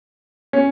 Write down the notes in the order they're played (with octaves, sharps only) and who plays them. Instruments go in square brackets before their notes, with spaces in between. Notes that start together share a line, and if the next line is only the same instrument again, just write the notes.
[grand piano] C#4